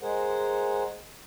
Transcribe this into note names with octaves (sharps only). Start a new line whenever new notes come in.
G#3 G#4 A#4 C5 F#5